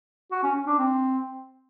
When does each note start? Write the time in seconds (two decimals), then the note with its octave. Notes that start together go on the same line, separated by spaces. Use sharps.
0.32 F#4
0.43 C#4
0.55 C#4
0.67 D4
0.78 C4